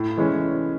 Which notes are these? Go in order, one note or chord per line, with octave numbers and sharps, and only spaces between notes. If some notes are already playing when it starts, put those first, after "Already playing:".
Already playing: A2
E3 G#3 C#4